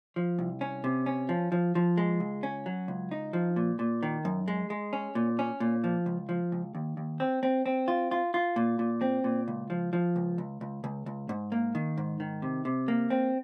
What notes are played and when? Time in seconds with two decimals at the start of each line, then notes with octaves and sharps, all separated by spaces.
0.16 F3
0.39 C2
0.61 C#4
0.84 C3
1.06 C#4
1.29 F3
1.52 F3
1.75 F3
1.97 G#3
2.20 C#2
2.43 C#4
2.66 F#3
2.88 C#2
3.11 D#4
3.33 F3
3.56 A#2
3.79 A#2
4.03 D#3
4.25 F#2
4.48 G#3
4.70 G#3
4.93 C#4
5.15 A#2
5.39 C#4
5.60 A#2
5.84 F3
6.06 C#2
6.29 F3
6.52 C#2
6.75 D#2
6.97 D#2
7.20 C4
7.43 C4
7.66 C4
7.88 F4
8.11 F4
8.34 F4
8.56 A#2
8.79 A#2
9.01 C4
9.24 A#2
9.48 C#2
9.70 F3
9.93 F3
10.16 C#2
10.38 C#2
10.61 C#2
10.84 C#2
11.06 C#2
11.29 G#2
11.52 A#3
11.75 D#3
11.98 G#2
12.20 D#3
12.42 C3
12.65 C3
12.88 A#3
13.10 C4